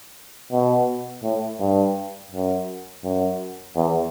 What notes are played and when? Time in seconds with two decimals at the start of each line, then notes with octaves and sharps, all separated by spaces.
0.52 B2
1.23 A2
1.60 G2
2.31 F#2
3.03 F#2
3.75 E2